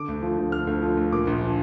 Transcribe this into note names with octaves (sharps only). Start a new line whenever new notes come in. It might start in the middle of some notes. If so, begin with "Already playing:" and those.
Already playing: D3 D6
D2
F3
D2
D3 F6
D2
F3
D2
A#2 D6
A#1
F3